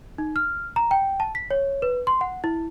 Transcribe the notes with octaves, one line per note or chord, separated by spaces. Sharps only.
D#4
F6
A#5
G5
A5
B6
C#5
B4
C6
F#5
E4